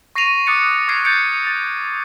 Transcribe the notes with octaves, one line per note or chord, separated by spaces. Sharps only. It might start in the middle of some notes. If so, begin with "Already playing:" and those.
C#6 A#6 C7 D7 D#7 F7
D6 D#6 F#6 A6 C#7 F7
C#6 F6 G#6 C7 D7
G6 A6 C#7 D7
A6